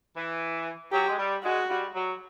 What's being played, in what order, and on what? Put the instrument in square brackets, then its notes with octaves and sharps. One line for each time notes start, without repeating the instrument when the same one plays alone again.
[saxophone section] E3
[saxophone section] F#3 [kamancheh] G4
[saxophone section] G#3
G3
[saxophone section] G#3 [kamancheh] F#4
[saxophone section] G3
F#3